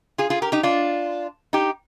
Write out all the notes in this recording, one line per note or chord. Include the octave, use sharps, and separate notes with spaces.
F4 G#4
F4 G#4
G4 A#4
D#4 G4
D4 F4
D#4 G4